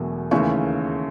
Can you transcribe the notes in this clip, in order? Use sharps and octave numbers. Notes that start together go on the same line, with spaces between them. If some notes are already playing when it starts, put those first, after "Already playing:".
Already playing: E1 E2 B2 F#3 A3
D#2 C#3 E3 A3 C#6